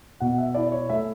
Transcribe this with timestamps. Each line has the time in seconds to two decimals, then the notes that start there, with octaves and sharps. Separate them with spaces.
0.20 B2 F#5
0.38 E5
0.54 E4 D5
0.66 D5
0.72 C#5
0.89 A3 E5